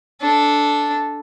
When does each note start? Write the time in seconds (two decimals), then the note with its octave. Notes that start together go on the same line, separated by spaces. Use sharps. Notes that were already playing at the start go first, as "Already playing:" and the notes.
0.22 D4 A4